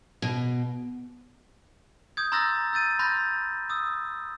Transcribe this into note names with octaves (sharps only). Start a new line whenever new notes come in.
B2
D#6 G6 G#6
A#5 C6 E6 F#6 A6 A#6
E6 G6 A6 D#7
B5 C6 F#6 G6 A6 A#6
D#6 E6